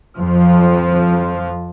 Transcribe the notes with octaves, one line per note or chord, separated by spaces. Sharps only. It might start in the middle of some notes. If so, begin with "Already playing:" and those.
F2 F3